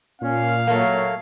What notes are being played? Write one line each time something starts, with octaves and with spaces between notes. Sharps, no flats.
A#2 C#4 F5
F#3 A3 A#3